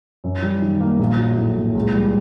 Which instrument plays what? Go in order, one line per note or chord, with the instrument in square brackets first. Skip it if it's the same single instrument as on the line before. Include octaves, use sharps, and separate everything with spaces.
[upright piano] F#2
G3
D#3
A#3
A#1
F#3
A2
A#1
C#2
G3